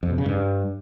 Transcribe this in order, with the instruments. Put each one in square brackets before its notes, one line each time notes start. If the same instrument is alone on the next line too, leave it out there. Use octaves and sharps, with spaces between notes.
[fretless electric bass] F2
B2
C#3
G2